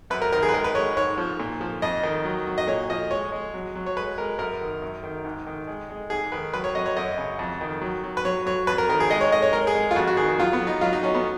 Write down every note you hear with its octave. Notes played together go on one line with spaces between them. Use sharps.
F#2 B4
A#4
D#3 A#4
G#4
B4
G#3 A#4
B4
G#3 C#5
G#2 C#5
F3
A#2
F3
F2 D#5
D#3
F#3
F#3
D#5
A#2 C#5
F3 D#5
G#3 C#5
G#3
F#3
F#3
C#5
G#3 B4
G#3 A#4
F#2 A#4
D#3
F#2
D#3
G#2
D#3
G#3
G#3
G#2 G#4
D#3 B4
F#3 B4
C#5
F#3 D#5
C#5
F#2 D#5
C#3
F2
D#3
F#3
F#3
B4
F#3 C#5
F#3 C#5
F2 B4
A#4
D#3 A#4
G#4
G#3 D#5
C#5
G#3 D#5
C#5
G#3 A#4
G#4
G#3
F4
F2 F#4
F#4
D#3 G#4
F#3 F4
B3
F#3
D#4
F#3 F4
D#4
F#3 C#4
B3